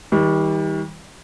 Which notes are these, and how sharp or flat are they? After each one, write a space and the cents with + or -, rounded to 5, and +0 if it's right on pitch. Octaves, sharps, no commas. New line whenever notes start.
D#3 +40 G3 +5